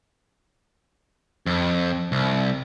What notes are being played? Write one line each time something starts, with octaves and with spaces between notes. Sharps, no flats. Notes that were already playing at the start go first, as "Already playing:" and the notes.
F2
C2